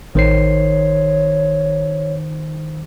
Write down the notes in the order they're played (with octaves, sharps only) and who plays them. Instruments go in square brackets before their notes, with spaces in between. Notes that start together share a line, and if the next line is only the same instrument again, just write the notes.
[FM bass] A1 [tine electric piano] D#3 C5 C7 [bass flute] C#5